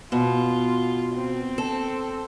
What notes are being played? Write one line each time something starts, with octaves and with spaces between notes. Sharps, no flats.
B2 F4
C4
A4